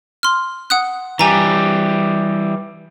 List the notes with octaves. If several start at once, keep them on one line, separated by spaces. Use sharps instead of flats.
C6 F6
F#5 D#6 F#6
E3 G3 G4 G#5 A#5